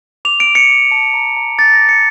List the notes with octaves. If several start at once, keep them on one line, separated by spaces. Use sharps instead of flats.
D6 F7
D7
D6
C#7
D6
A5
A#5
A#5
D6 A6
A#6
D6
C#7